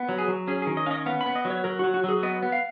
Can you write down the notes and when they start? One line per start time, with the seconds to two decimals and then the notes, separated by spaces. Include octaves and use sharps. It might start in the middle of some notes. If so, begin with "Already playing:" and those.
Already playing: B3
0.09 F#3
0.18 G#4
0.28 F#3
0.48 C#4 G#4
0.62 G#4
0.67 D#3
0.77 D#5
0.86 C#4 F5
0.91 D#5
1.06 B3 F5
1.21 B5
1.26 B3
1.35 D#5
1.45 F#3
1.50 C#5
1.64 F#3 A#4
1.79 F#4
1.84 F#3
1.94 F#4
2.04 F#3 G#4
2.23 B3 D#5
2.43 B3
2.52 F5